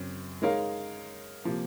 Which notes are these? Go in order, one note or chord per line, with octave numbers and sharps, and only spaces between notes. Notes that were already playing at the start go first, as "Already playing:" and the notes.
Already playing: F#2 C#3 C4
G#3 D#4 A#4 C#5 F5
C3 F3 A#3